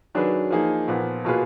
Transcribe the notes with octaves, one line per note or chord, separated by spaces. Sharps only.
D#3 F#3 D4 G#4 B4
F3 A#3 D#4 G#4
A#2 F3 B3
B2 A#3 F4 G#4 B4